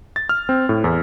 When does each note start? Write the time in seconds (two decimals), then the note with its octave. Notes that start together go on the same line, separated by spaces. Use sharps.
0.16 A6
0.29 F6
0.49 C4
0.69 A2
0.84 E2